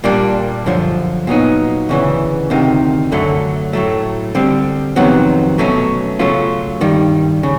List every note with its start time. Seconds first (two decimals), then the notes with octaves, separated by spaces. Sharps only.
0.04 A#2 G3 A#3 D4
0.66 F#2 D3 F3
1.27 A#2 F#3 B3 D#4
1.89 D2 C#3 E3
2.50 D2 C3 D#3
3.12 F#2 D3 F#3 A3
3.73 A2 F#3 A3
4.35 D3 G3 C4
4.96 F2 C3 D#3 F#3 B3
5.58 B2 F#3 A3 C#4
6.19 C#3 F#3 A3 C#4 F4
6.81 G2 D#3 G3
7.43 C#3